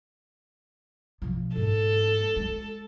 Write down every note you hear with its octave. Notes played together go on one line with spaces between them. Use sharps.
B2 F3
G#2 A4
G#3